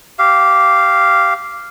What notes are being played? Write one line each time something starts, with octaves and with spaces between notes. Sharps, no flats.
G4 F5